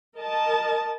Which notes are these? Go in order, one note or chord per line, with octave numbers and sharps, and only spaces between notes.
A#4 D#5 A5